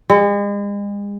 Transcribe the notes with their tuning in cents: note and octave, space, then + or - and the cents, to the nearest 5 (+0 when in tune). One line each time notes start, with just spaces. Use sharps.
G#3 -40